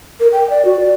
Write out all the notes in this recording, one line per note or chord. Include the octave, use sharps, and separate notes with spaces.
A#4
G5
D5
F#4
D5